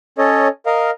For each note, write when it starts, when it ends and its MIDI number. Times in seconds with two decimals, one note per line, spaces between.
0.18 0.48 61
0.18 0.48 69
0.18 0.48 73
0.18 0.48 75
0.66 0.91 70
0.66 0.91 75
0.66 0.91 77